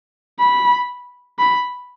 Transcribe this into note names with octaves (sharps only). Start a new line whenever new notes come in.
B5
B5